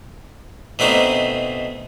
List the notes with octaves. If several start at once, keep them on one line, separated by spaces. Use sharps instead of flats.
B2 A3 C4 D4 D#4